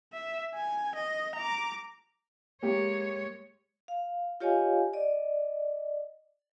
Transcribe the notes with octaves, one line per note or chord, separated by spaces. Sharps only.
E5
G#5
D#5
A#5 D6
G#3 A#3 G4 C#5
F5
F4 G4 C#5 D#5 F5 G#5
D5 D#5